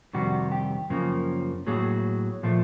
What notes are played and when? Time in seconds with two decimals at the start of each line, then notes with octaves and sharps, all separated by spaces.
0.13 F2 C3 D#3 G3 F#4
0.52 G4
0.90 F#2 C#3 F3 A#3
1.67 A2 F#3 A#3 G#4
2.43 A#2 F3 A3